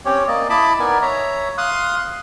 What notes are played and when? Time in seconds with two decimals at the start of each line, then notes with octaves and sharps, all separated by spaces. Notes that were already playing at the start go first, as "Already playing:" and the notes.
0.06 C4 C#4 G4 C#5
0.28 A#3 D5 D#5
0.50 E4 D#5 A5 B5 D6
0.80 B3 D#4 A#4 D5 G#5
1.02 C#5 E5 A#5
1.58 F5 C6 D#6 F#6